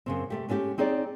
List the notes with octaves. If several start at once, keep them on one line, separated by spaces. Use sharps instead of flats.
F#2 C#3 C4
C3 A3 G4
G#3 A3 C#4 F#4 G4
C4 D#4 G#4 C#5 D5